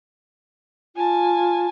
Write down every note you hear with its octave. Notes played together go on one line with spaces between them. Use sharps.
F4 G#5 A5